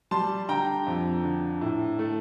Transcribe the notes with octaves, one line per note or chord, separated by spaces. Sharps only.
G3 A5 C6
D3 G5 A#5
F2
D3
A2
A3